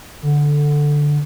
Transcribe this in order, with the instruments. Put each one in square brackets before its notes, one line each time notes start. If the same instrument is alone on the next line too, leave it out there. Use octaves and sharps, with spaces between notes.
[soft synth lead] D3